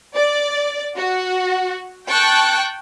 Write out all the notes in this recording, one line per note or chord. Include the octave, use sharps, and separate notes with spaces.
D5
F#4
G5 A5 C#6 F#6